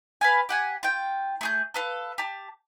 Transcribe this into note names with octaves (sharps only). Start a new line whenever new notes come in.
B4 F5 G#5
G4 F#5 G#5
F4 G5
A3 G#4 G6
A4 B4 F5
G4 A5